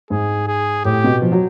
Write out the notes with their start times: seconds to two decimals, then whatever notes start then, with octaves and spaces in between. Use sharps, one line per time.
0.10 G#2 G#4
0.48 G#4
0.85 A2 G4
1.04 B2
1.22 F3
1.32 F#3